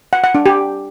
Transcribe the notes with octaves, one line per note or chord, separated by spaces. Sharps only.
F#5
F#5
D4
G4